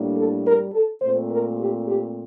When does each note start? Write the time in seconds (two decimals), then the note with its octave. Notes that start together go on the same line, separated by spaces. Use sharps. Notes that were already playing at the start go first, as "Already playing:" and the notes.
Already playing: A2 G3 A#3 D4
0.15 A4
0.45 A#4
0.73 A4
1.01 A#2 A3 C4 C5
1.30 A#4
1.58 G4
1.87 G4